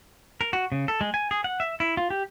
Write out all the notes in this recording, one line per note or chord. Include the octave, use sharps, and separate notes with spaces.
A#4
F#4
C#3
A4
G#3
G#5
G#4
F#5
E5
E4
F4
G4